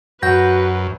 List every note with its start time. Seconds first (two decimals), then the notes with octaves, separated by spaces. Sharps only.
0.22 F#2 F#4 B4 F#5 G6 A#6